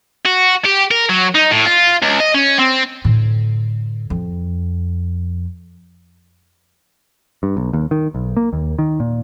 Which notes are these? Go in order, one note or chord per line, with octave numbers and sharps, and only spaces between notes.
F#4
G4
A#4
F#3
D#4
A2
F4
C#2
D#5
C#4
C4
A2 D3
F2
G2
B1
D#2
D#3
B1
A#3
D#2
D#3
A#2